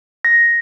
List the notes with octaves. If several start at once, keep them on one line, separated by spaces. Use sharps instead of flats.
A#6